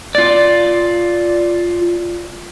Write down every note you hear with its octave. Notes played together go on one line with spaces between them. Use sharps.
F4 D5